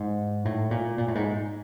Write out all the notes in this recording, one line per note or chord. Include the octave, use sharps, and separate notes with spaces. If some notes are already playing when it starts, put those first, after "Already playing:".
Already playing: G#2
A2
A#2
A#2
A2
G#2